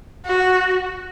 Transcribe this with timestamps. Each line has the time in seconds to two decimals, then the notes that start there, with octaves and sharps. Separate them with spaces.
0.25 F#4